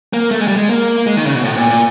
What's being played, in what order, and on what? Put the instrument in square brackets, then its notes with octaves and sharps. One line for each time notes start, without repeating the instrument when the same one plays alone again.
[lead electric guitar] A#3
A3
G#3
G3
G#3
A#3
G#3
D#3
C#3
B2
A2
A#2
A#2